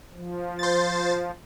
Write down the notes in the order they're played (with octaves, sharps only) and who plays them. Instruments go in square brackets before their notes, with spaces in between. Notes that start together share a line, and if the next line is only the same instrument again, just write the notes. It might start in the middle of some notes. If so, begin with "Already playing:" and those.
[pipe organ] F3
[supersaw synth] C5 A6